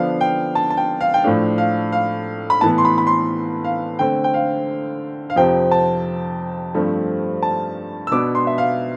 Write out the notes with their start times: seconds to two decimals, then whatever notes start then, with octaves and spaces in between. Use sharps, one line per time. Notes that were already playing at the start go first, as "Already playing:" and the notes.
Already playing: D3 F3 B3 D4 F5
0.21 G5
0.55 A5
0.70 A5
0.77 G5
1.01 F5
1.14 G5
1.24 A2 F3 A3 D4 F5
1.58 F5
1.92 F5
2.50 B5
2.61 A2 E3 B3 A5
2.78 C6
2.85 B5
2.98 B5
3.07 C6
3.64 F5
3.99 D3 A3 C4 G5
4.24 G5
4.34 F5
5.30 F5
5.36 F2 C3 F3 C4 G5
5.71 A5
6.74 G2 F3 A3 C4
7.43 A5
8.07 E6
8.11 B2 B3 D4 D6
8.35 C6
8.47 E5
8.58 F5